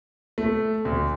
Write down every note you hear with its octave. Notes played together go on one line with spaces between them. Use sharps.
A3
D2